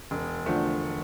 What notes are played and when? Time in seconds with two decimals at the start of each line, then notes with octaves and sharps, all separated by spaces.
0.11 E1
0.46 D3 F3 A3